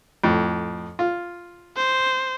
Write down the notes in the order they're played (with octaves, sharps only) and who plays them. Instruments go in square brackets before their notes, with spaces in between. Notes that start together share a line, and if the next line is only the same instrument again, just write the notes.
[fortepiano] F2 A2
F4
[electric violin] C5